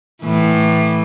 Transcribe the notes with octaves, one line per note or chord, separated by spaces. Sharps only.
A2 E3